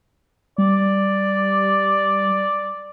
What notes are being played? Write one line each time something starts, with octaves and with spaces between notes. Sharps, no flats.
G3 D5